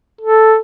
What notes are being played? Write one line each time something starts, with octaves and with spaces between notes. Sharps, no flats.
A4